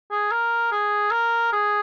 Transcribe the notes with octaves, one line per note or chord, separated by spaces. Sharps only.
G#4
A#4
G#4
A#4
G#4